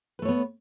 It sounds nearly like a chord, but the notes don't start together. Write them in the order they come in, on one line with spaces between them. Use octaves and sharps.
B4 A3 C#5 B3